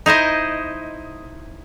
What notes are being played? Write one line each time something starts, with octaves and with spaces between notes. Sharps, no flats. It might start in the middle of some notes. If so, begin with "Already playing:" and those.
D#4 E4 C5 D#5